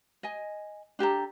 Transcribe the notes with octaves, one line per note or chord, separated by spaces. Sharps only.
D#5 G#5
D4 G4 A4 A#5